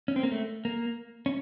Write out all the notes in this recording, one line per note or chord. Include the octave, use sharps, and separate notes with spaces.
C#4
C4
A#3
A3
A#3
C#4